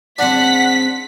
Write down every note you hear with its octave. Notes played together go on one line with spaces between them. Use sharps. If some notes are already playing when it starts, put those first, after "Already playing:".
C#3 G#3 C4 D4 F#5 B6